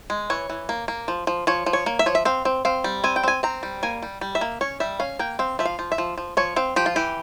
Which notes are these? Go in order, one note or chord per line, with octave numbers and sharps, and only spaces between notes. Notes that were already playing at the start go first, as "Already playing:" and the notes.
G#3
E3 C#5
E3
A#3
A#3
F3
F3
F3 C#5
F3
C#5
A#3
E5
F3 C#5
E5
C4 F5
C4
C4 F5
G3
C4 G#5
G5
C4 G#5
C4 A#5
G3
A#3 G#5
G3
G3
E5
A#3
C#4 C#5
G3 E5
C#4 F5
A#3 G5
C4 F5
F3 E5
F5
F3
E5
F3
F3
F3 C#5
C4 F5
F3 G4
F4
E3 G4